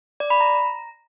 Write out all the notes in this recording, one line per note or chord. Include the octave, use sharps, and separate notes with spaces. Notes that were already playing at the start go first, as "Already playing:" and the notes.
D5
B5
A#5